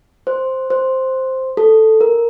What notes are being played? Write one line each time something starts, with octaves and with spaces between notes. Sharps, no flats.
C5
C5
A4
A#4